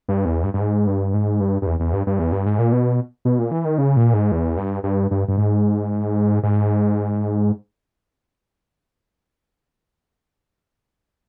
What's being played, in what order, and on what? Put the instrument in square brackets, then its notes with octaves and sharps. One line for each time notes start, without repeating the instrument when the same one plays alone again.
[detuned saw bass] G2
E2
G2
G2
G#2
G2
G#2
G2
G2
E2
E2
G2
G2
E2
G2
G#2
A#2
B2
B2
A#2
E3
D#3
C#3
A#2
G#2
E2
G2
G2
G2
G2
G#2
G#2